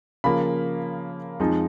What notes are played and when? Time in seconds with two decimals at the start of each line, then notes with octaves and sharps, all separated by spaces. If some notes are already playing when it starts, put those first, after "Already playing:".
0.24 C#3 F3 A#3 B5
1.40 F2 F3 G#3 D#4